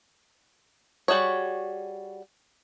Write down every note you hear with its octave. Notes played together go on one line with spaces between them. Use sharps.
G3 F#4 G#4 C#5